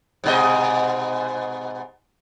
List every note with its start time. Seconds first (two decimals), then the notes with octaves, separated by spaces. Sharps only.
0.24 G#2 B2 D#5